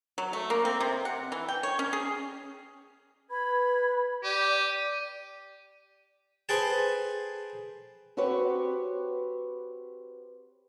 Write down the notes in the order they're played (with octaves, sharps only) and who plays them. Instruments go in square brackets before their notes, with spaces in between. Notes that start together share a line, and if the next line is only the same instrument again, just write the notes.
[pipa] F#3
A3
A#3
C4
C3
F#5
E3
G5
C#5
C#4
G#4
[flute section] B4 G#6 [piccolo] B5
[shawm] G4 [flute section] D5 [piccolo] D#7
[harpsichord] G#4 A4 B4 C5 G5 A5
[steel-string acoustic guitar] C4 F#4 G4 B4 C#5